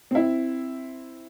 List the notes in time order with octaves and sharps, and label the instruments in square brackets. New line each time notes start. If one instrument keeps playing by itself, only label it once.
[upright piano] C4 E4